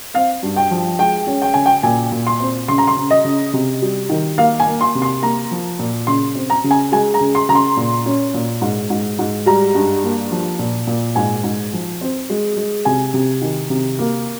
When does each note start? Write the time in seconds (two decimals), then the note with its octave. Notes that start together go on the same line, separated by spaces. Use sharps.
0.14 C4 F5
0.43 G2
0.56 G5
0.71 F3
0.99 G#3 G5
1.27 C#4
1.42 G5
1.54 C#3 G#5
1.66 G5
1.83 A#2 G#5
2.12 A#2
2.27 C6
2.40 C4
2.68 C#3 C6
2.78 A#5
2.87 C6
2.97 C#3
3.10 D#5
3.24 C#3
3.53 C3
3.82 G3
4.09 D#3
4.38 A#3 F5
4.60 G#5
4.67 A#3
4.81 C6
4.95 C3
5.02 C6
5.22 A#3 A#5
5.51 F3
5.79 A#2
6.07 C#3 C6
6.35 C4
6.50 A#5
6.64 C#3
6.71 G#5
6.92 G#3 G#5
7.14 A#5
7.20 C#3
7.35 C6
7.49 C#3 A#5
7.55 C6
7.77 A#2
8.06 C#4
8.34 A#2
8.62 G#2
8.90 G#2
9.19 G#2
9.46 G3 A#5
9.75 G2
10.04 A#3
10.31 F3
10.59 A#2
10.87 A#2
11.15 G#2 G#5
11.44 G#2
11.73 F3
12.01 C4
12.30 G#3
12.57 G#3
12.85 C3 G#5
13.14 C3
13.42 D#3
13.70 C3
13.99 A#3